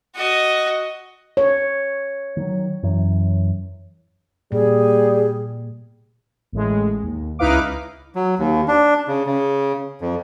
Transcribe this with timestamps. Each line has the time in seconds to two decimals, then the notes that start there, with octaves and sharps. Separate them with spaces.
0.16 F#4 D#5
1.37 C#5
2.37 D#3 F#3
2.83 F#2 E3 F#3
4.52 A#2 G3 G#4
6.52 A1 A2 G#3
7.03 D#2
7.39 C#2 D#4 E4 B4 F5 D6
8.15 F#3
8.39 D#2
8.68 D4
9.08 C#3
9.26 C#3
10.01 F2